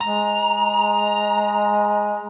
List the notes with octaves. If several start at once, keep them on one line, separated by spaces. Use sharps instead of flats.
G#3 A#5